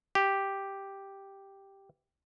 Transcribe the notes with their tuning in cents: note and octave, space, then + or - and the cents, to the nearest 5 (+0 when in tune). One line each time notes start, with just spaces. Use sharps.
G4 +0